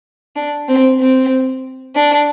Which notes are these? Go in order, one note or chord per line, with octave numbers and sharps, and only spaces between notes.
D4
C4
C4
D4